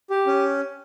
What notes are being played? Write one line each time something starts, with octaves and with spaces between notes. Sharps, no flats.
G4
C#4